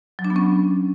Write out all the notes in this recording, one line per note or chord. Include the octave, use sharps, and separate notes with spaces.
F#3
D4
B3
C#4